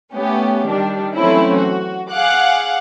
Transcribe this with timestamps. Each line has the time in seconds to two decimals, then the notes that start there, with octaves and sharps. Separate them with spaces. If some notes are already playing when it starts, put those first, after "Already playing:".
0.14 A3 B3 C#4 G4
0.66 D#3 G3 D4
1.16 E3 F#3 A3 C4 C#4 E4
1.56 F#4
2.10 G#4 F5 F#5 D6 F#6